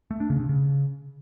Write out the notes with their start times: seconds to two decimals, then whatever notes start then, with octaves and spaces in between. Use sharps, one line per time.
0.11 A3
0.20 D4
0.30 C#3
0.39 C3
0.49 C#3